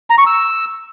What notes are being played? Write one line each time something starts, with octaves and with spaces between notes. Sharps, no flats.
A#5
C#6
E6